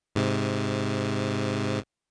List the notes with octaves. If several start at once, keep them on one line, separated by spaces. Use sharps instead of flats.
G#2 C3